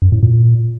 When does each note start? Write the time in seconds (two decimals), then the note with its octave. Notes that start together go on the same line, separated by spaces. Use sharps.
0.02 F#2
0.12 A2
0.23 A#2